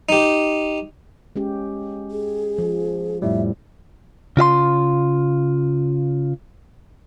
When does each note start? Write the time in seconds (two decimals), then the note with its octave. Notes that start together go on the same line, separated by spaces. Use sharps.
0.09 D#4 G4
1.36 G#3 C#4 G4
2.11 G#4
2.58 F3
3.22 F2 A2 G3 E5
4.37 C#3 F4 E5 C6